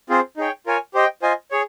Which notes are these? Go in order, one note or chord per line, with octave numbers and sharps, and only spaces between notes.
C4 F4 G#4 C5
D#4 G#4 C#5 G5
F4 A#4 C#5 G#5
G4 C5 D#5 G5
F4 C5 D#5 G#5
G#4 C#5